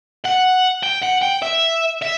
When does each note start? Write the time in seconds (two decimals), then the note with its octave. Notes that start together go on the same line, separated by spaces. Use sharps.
0.24 F#5
0.84 G5
1.03 F#5
1.23 G5
1.43 E5
2.02 E5